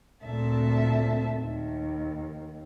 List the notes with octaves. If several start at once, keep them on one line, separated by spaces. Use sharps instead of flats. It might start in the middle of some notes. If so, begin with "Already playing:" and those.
D2 A#2 C4 A4 E5 A5
D#2